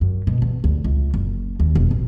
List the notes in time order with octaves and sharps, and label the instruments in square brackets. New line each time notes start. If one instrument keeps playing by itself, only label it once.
[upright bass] F#2
B2
E2
D2
C#2
F#1
D#2
E1
A1